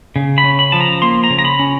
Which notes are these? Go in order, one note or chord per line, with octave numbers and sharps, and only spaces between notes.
C#3
B5
C#4
B5
F3 A5
A#5
A#3 C6
A#5
C#3
A#5
B5
C#4